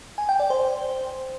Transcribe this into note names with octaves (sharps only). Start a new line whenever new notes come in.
G#5
G5
D5
C5